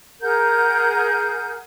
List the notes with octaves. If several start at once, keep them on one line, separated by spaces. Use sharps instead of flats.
G#4 A#4 F#5 G6